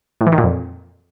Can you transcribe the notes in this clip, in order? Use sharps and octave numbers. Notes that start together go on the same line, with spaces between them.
A2
E3
D#3
A#2
F2